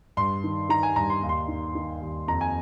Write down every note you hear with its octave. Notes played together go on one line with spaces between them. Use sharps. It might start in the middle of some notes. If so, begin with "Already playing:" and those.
G2 C6
D#3
D#3 A#5
G#5
G2 A#5
C6
D#2
C6
D#3
D#3
D#2
F2 A#5
G#5